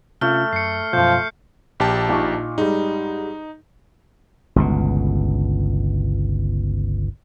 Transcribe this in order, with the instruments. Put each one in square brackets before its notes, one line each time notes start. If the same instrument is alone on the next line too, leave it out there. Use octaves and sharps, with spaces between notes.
[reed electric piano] C3 C#4 F4 [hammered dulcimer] A3 [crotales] F6
[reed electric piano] F#2 [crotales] C7 C#7
[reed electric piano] F#2 B2 [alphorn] F3 [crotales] G6
[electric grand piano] A#1 G4 A5
[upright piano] A#2 D#4 C#6
[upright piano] G#2 G3 [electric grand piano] D#4
[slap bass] G1 C#2 B2